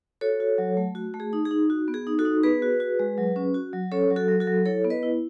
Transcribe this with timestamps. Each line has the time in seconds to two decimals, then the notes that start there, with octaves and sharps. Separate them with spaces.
0.21 F#4 A4 C#5
0.40 F#4
0.58 F#3
0.77 A3
0.95 F#4
1.14 A3
1.20 G#4
1.33 D#4
1.45 G#4
1.51 D#4
1.70 F#4
1.88 B3
1.94 G#4
2.07 D#4
2.18 F#4 A4
2.25 D#4
2.43 B3 G#4 B4
2.62 F#4
2.80 F#4
3.00 G#3
3.18 F#3
3.36 C#4
3.54 F#4
3.73 F#3
3.92 C#4 A4 C#5
4.10 F#3
4.16 F#4 A4
4.29 F#3
4.40 F#4 A4
4.47 F#3
4.66 E4 A4 C#5
4.84 B3
4.90 B4 D#5
5.03 E4